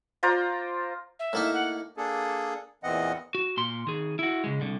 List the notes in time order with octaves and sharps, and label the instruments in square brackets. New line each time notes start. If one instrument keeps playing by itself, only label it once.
[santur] F4 C5 D5 A#5
[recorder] E5
[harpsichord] A2 A#3 D#4
[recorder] F#5
[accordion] A#3 D4 G#4 A4
E2 A#2 E3 C4 D#5 F#5
[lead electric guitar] F#4
A#2 C6
D#3 G#4
E4 F#4
C#3 G#3
C2 D3